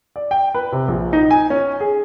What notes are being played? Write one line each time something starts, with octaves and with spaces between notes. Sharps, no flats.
D5
G5
B4
C3
A#1
D#4
G#5
C#4
G#4